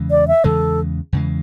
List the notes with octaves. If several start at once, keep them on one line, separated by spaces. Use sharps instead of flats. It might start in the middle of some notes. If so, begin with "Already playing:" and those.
Already playing: E2 C#3 E3 G#3
D5
E5
E2 C#3 E3 G#3 A4
E2 C#3 E3 G#3